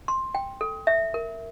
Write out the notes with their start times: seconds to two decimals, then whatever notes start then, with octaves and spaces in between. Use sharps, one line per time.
0.08 C6
0.35 G5
0.61 A4
0.87 E5
1.14 A#4